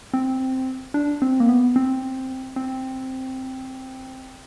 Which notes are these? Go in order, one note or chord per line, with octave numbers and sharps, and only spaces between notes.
C4
D4
C4
A#3
B3
C4
C4